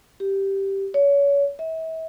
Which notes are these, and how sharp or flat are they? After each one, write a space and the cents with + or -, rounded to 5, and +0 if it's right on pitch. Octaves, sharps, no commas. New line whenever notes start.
G4 -5
C#5 +30
E5 -35